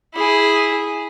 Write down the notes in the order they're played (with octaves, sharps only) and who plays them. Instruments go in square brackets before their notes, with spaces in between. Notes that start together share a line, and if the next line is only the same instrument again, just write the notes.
[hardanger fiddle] E4 G#4